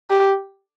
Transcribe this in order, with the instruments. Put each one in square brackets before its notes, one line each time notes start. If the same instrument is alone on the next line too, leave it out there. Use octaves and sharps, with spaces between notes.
[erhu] G4